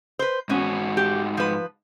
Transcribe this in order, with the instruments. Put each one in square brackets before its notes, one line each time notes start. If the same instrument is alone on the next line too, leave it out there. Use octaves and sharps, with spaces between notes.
[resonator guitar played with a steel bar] B4 C5
[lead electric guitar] G#2 F#4 [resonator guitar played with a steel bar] B3 C#4
[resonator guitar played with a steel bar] G4
F3 B4